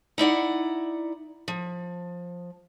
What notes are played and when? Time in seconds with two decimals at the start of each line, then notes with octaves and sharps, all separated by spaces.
0.18 D#4 E4 D5 F#5
1.48 F3